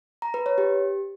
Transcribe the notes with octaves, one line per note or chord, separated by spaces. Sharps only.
A#5
B4
C#5
G4